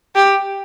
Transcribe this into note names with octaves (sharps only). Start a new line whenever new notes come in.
G4